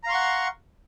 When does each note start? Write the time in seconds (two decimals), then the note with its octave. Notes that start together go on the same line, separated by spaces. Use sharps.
0.04 A#5
0.06 F5
0.09 C6
0.12 C#6
0.14 F#5